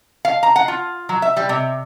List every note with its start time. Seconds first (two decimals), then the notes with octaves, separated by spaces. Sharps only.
0.25 F5
0.43 A#5
0.56 F#5
0.68 F4
1.09 F#3
1.22 E5
1.37 G3
1.49 C3